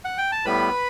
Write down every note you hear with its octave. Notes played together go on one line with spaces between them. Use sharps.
F#5
G5
A5
A2 G3 B3 B4 B5